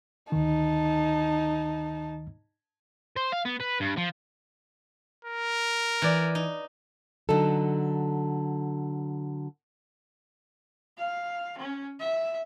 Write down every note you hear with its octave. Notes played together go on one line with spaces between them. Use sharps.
D2 D#3 D#4 A5
C5
F5
B3
B4
G2
F3
A#4
E3 D5
D#4
D3 F#3 D#4 A4
F5
C#4
E5